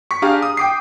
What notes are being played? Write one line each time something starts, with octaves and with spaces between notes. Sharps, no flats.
C#6 B6
D4 G4 G#4 F5 A#5
D#6
G5 D6 C7